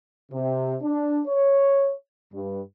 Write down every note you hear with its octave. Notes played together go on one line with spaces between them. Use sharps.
C3
D4
C#5
G2